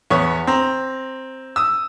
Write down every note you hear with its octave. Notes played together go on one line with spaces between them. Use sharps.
E2 B3 C#5 C#6
C4 A#5
D#6 E6